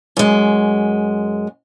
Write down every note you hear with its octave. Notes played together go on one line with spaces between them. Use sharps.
F#2 G#3